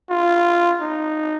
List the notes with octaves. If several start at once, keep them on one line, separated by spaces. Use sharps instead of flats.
F4
D#4